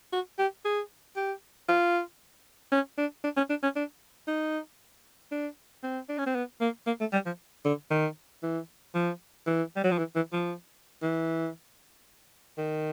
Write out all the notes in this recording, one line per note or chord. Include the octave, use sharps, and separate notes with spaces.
F#4
G4
G#4
G4
F4
C#4
D4
D4
C#4
D4
C#4
D4
D#4
D4
C4
D4
C#4
C4
B3
A#3
A#3
A3
G3
F3
D3
D#3
E3
F3
E3
G3
F#3
F3
E3
E3
F3
E3
D#3